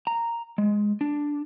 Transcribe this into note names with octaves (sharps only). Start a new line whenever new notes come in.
A#5
G#3
D4